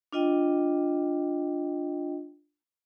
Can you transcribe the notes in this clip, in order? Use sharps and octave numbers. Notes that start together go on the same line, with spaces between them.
D4 F4 D#5 G5